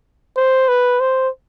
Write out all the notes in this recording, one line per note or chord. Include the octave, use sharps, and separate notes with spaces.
C5
B4
C5